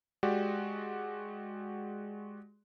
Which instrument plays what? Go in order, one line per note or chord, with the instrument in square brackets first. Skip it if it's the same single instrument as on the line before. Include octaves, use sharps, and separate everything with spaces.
[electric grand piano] G#3 F#4 G4 D5